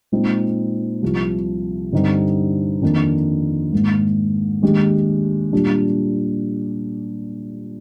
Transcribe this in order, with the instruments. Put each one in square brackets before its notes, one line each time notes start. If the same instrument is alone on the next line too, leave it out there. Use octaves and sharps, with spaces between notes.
[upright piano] A#2 G#3 C4 D#4
C2 C3 F3
G2 D3 G3 C4 D#4
F2 D#3 A#3 D4
G#2 D#3 A#3
D#2 D#3 G#3 D4 G4
A#2 G3 D4